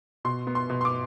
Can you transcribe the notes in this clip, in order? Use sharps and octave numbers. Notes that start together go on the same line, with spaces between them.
B2 C6
B3
C6
B2
C6
D6